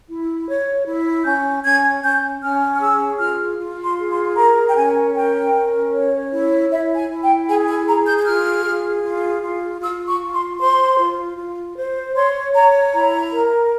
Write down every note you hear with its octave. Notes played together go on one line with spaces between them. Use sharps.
E4
C#5
E4
C#4 G6
C#4 G#6
C#4 G6
C#4 F6
F6
G#4 E6
F4 F6
F4
C6
G#4
C6
A#4 A#5
G5
C#4 G#5
A#4 G5
C#4
C#5
E4
E4 E5
G#5
E4
G5
G#4 G#5
G#5
G#4 A#5
G6
G6
F4 F6
G#4
F4
F4
F4 E6
C#6
F4
C6
C5 C6
F4
F4
C5
C#5 C6
C#5 A#5
E4 A#5
A#4